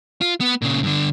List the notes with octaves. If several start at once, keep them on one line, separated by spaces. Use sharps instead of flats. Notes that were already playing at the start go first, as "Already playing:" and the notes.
F4
B3
A#2 C#3
G2 D3